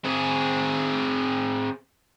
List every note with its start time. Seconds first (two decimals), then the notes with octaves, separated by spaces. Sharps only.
0.04 C4 G#4